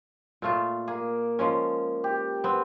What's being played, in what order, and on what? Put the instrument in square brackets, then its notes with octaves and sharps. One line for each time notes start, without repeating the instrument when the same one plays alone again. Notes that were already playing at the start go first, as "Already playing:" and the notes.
[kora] A#2 A3 F4
[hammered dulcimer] A#3 [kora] G#4
[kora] F3 G#3 C#4
[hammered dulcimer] G4
[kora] B3 C4